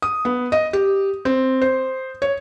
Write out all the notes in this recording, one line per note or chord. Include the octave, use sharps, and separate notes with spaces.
D#6
B3
D#5
G4
C4
C5
C#5